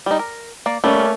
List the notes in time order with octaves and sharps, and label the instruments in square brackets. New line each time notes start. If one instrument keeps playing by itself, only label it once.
[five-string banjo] G3 D#4
A#4
A#3 D5
[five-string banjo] G3 [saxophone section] A3 A#3 C#4